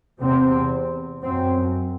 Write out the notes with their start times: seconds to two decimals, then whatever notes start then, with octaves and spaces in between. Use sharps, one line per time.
0.21 E2 C3 C4
1.23 F#2 C4